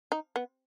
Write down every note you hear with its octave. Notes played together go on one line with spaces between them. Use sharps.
D#4
B3